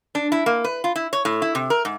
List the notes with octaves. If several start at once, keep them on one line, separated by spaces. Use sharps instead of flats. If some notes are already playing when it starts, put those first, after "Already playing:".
D4
E4
A#3
B4
F4
E4
C#5
A2
E4
C3
A#4
G#2